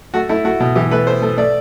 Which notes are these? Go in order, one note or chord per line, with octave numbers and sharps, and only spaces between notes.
A3 F#4
A3 E4
A3 F#4
B2
E3 G4
A3 B4
A3 C5
A3
A3 D5